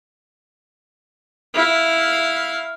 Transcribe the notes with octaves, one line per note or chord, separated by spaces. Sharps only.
E4 F5